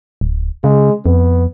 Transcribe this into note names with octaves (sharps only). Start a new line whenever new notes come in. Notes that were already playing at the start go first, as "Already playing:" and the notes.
D1
C#3 G#3
F2 B3